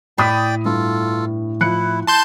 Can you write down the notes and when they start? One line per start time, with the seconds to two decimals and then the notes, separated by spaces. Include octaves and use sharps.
0.18 A2 D5 G5 B5 D#6 B6
0.65 G2 F4 A4
1.61 F3 E4 F#6 C#7
2.07 A5 C6 G6